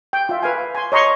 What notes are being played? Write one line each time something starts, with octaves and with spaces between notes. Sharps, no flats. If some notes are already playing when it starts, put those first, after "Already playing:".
G5
F4 E5
B4 F5 G#5
G#5 C6
C#5 D#5 A#5 C6 C#6